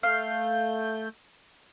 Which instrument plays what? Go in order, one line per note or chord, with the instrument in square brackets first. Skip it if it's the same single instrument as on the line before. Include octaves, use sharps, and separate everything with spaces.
[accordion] A3 G6 [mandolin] F5